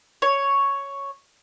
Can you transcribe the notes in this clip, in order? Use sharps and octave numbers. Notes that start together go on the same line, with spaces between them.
C#5